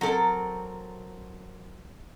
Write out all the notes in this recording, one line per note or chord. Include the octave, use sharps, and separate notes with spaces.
F#3 C4 A4 A#4